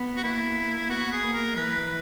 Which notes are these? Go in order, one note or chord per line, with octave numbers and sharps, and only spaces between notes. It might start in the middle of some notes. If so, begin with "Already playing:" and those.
Already playing: B3
F#4
A#3 E4
B3 F#4
G#4
A#3
A#4
E3 B4